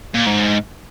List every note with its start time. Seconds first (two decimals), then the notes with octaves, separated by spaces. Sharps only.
0.15 A#2
0.27 G#2